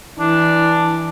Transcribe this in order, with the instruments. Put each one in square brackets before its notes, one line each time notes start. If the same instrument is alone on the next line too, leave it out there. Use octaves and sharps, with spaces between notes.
[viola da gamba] E3 [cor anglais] D4